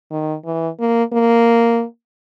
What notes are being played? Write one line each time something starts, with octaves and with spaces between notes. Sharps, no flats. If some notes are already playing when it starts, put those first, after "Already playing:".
D#3
E3
A#3
A#3